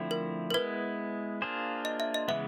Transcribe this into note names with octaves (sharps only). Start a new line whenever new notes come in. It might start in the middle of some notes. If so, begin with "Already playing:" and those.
Already playing: D3 F3 A3 C4 E4
A#4
A#4
G#3 B3 E4 B4
A#3 D4 F4 G#4 C5
D#5
E5
D#5
C#3 E3 G#3 B3 E5